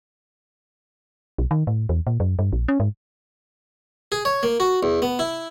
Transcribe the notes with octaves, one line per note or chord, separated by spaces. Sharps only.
B1
D#3
A2
E2
A#2
F#2
G2
A#1
C#4
G#2
G#4
C#5
A#3
F#4
E2
B3
E4